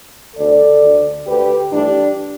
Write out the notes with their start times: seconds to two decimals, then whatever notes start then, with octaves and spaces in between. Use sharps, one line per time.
0.36 D2 D3 B3 A4 D5
0.81 D2 D3 A3
1.25 D2 D3 A3 G4 B4
1.70 G2 E3 A3 D4 G4